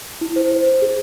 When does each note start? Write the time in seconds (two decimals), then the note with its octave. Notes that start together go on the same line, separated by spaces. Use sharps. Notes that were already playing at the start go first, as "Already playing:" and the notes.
0.21 E4
0.36 C5
0.52 C5
0.66 C5
0.82 G#4